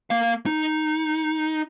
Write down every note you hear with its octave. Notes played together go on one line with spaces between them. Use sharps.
A#3 F5
D#4